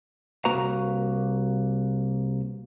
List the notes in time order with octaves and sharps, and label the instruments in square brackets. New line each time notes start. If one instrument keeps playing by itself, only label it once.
[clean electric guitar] C2 A#3 F#4 B4 A#5